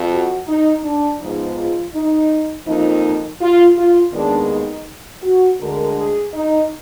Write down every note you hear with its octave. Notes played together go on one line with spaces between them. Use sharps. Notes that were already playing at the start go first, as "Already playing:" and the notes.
Already playing: F2 F3
F#4
D#4
D4
G#2 F3 G#3 B3 D#4
F4
D#4
F2 F3 A#3 D#4
F4
F4
D#2 D#3 G#3 B3 D4
D#4
F#4
D2 D3 G#3 A#4
G#4
D#4